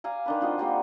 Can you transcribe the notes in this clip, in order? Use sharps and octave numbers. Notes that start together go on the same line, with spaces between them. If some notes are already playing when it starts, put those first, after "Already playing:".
D5 F5 G#5 A#5
D#3 D4 B4
C4 F4 F#4 D#5
F3 G3 A#3 F#4